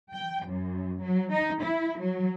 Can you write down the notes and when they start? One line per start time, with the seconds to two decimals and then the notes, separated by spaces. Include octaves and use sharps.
0.13 G5
0.46 F#2
1.02 F#3
1.32 D#4
1.62 E4
2.01 F#3